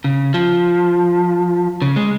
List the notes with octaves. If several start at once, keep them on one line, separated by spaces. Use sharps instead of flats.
C#3
F3
C#3
G#3